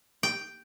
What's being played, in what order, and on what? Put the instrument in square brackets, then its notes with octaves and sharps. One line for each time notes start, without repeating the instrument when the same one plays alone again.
[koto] G5